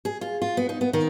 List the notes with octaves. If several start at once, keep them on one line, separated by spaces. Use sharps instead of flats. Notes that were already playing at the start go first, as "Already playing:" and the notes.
G#4
F4
F4
B3
D#4
B3
D#3